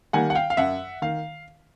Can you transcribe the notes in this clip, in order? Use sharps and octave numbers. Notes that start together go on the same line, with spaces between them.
D#3 G3 A#3 F#5 G#5
F#5
F5 G5
F5
F#2 E5 F#5
D#3 F5